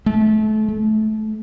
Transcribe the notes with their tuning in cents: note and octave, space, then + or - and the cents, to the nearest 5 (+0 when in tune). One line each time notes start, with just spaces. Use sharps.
A3 -30
A3 -25